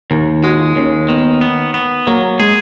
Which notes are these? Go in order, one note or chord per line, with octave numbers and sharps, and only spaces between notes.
D#2 A#3
G#3 F#4
F4
D#2 C#4
D#3 B3
B3
B3
F#3 A#3
G#3 G#4